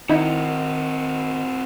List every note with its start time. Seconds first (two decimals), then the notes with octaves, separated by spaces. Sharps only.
0.09 D#3 C4 D#4 E4 F#4